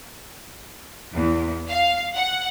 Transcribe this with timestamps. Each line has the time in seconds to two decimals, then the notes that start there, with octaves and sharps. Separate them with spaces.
1.13 E2
1.68 F5
2.16 F#5